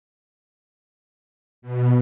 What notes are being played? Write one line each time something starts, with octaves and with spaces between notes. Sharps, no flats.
B2